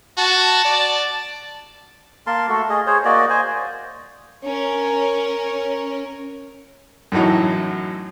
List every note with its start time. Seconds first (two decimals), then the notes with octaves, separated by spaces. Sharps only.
0.17 F#4 A5
0.64 D5
2.27 A#3 A#4 A5 C6
2.49 A3 F#4 A4
2.70 G#4 D#5
2.87 G#4 C5 C#5
3.05 A#3 F#4 D5 D#5
3.30 C5 G#5
4.44 C#4 A#4
7.12 F#2 A2 E3 F#3 D#4